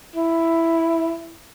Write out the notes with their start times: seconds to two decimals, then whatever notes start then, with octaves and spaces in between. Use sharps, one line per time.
0.16 E4